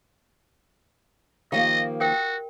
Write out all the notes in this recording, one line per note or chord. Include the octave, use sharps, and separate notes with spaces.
D#3 F3 A#3 G4 D#5 F5
F#4 A#4 G5